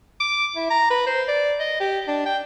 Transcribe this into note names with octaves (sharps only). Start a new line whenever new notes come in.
D6
E4
A#5
B4
C5
D5
D#5
G4
D4
G5